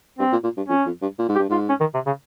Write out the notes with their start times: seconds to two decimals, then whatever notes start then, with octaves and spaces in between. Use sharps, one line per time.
0.19 G2 C4
0.32 A#2
0.44 A#2
0.57 G2
0.69 F2 C#4
0.86 F2
1.02 G2
1.19 A#2
1.29 G#2
1.35 G4
1.39 G2
1.49 G#2 F4
1.69 C#4
1.80 D#3
1.94 C3
2.06 C#3